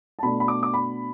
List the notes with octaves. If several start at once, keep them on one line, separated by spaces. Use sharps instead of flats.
A5
B2 A3 D4 B5
B5
D6
D6
B5